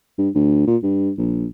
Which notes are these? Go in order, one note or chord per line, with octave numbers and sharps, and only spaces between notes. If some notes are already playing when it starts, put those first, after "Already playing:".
G2
D2
A#2
G2
A#1